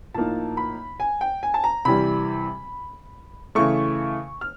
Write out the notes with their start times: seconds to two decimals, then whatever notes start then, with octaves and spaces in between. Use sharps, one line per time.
0.14 A2 F3 A#3 D#4 A5
0.57 B5
1.00 G#5
1.21 G5
1.43 G#5
1.54 A5
1.64 A#5
1.85 C3 E3 G3 B5
3.55 C#3 E3 A3 C#6
4.41 F6